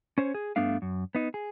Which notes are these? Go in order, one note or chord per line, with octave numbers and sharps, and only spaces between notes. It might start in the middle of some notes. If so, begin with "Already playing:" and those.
C#4 C5 C#5
G#4
G2 A3 B3 D4 F5
F#2
B3 D#4
G#4